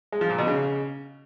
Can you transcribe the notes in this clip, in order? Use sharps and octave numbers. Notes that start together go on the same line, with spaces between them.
G#3
F3
A#2
B2
C#3